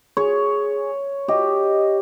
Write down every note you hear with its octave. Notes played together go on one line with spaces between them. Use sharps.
G#4 C#5
G4 D#5